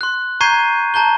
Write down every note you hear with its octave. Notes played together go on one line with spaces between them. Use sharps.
C6 F#6
A#5 C#6 G6 G#6 C7 D#7
A5 A#5 G6 G7